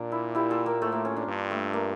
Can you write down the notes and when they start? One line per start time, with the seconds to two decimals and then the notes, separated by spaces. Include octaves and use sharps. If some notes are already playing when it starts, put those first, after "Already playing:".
Already playing: A#2 A#3 D4
0.12 E4
0.35 E4 G4
0.50 F4 A4
0.66 A#3
0.81 A2 A3
0.92 A#3
1.05 C#4
1.17 D4
1.28 G2
1.51 A3
1.73 A#3